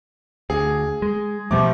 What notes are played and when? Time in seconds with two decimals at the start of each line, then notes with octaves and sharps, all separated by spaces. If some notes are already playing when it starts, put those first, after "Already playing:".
0.50 D2 G#4
1.02 G#3
1.51 A1 B2 F3 G3 A3 D6